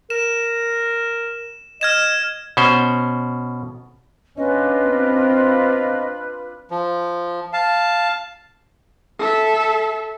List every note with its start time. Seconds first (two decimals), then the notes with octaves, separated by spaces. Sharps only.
0.10 A#4 E7
1.81 D#5 F6 G#6 E7
2.57 B2 C#4 C5
4.37 C#4 D4 F4 B4 D#5
4.84 C4
6.71 F3
7.53 F5 A5
9.19 A4 E5